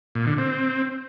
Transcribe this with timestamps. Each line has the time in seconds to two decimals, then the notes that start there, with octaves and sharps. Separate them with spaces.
0.15 A#2
0.27 D3
0.38 C4